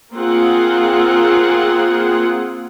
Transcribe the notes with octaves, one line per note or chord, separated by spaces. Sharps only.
A#3 C4 F4 G#4 F#5